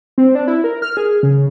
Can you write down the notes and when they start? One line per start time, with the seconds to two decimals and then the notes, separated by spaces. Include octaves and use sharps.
0.18 C4
0.35 D4
0.48 E4
0.64 A#4
0.82 F6
0.97 G#4
1.23 C#3